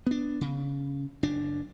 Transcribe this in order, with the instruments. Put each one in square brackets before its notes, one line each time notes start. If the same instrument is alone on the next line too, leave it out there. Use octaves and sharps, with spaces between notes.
[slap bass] B3 D4
C#3
F#1 D4